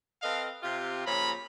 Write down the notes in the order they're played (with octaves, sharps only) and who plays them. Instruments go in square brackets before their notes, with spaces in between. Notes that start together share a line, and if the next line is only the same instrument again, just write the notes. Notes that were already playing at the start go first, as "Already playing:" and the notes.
[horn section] C4 A4 B4 D#5 F5
C3 F4 G4
A#2 C#3 F3 C#5 A#5 B5